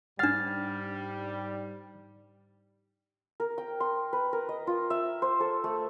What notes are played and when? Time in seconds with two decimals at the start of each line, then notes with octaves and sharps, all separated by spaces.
0.19 G#2 G3 D4 F#5 F6 A6
3.40 A#4
3.58 G5
3.80 C6
4.13 B4
4.33 A#4
4.49 D#5
4.67 F4
4.90 E5
5.22 C5
5.40 A4
5.64 A3